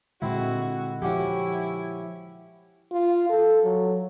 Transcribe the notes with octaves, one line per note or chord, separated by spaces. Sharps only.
A#2 D3 G#3 C4 E4 F#4
F3 C#4 E4 F#4 G4
F4
A4
F#3